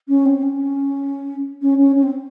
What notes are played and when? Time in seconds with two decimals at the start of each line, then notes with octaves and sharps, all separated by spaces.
0.08 C#4
0.25 C4
0.43 C#4
1.62 C#4
1.78 C#4
1.96 C#4
2.03 C4